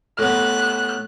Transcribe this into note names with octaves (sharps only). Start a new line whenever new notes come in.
A2 B3 F#6